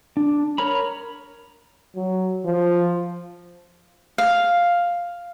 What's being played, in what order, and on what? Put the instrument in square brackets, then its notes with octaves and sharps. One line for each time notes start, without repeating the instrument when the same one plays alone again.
[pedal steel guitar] D4
A#4 C#5 A#5 B5
[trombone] F#3
F3
[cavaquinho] F5